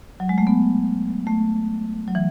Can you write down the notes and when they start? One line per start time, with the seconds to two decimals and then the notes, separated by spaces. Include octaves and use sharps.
0.20 F#3
0.29 G#3
0.38 A3
0.47 B3
1.27 A3
2.08 F#3
2.15 E3